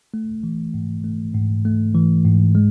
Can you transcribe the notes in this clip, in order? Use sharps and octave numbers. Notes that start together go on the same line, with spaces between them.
A3
E3
G#2
A3
G#2
A3
E3
G#2
G#3